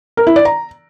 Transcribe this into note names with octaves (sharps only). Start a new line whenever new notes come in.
A#4
E4
D5
A#5